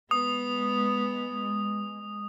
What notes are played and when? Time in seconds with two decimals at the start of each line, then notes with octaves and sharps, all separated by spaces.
0.11 G#3 B3 D#6